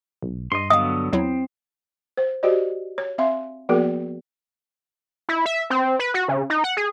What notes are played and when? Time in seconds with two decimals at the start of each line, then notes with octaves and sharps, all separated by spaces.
0.23 B1
0.52 G2 D#5 C6
0.70 D3 F#3 B3 D#5 F5 D#6
1.12 E2 F#3 C4 E4
2.17 C5
2.43 F#4 G4 C5 D5 D#5
2.98 C#5
3.18 C4 E5 F5 C6
3.69 F3 A#3 B3 F#4 G#4 A#4
5.29 E4
5.46 E5
5.70 C4
5.99 B4
6.14 F#4
6.28 C#3
6.50 D#4
6.64 F#5
6.77 G#4